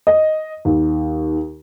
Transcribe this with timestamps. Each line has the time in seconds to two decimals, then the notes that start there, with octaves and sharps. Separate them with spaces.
0.07 D#5
0.65 D#2